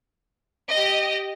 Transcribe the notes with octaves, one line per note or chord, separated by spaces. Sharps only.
G4 D#5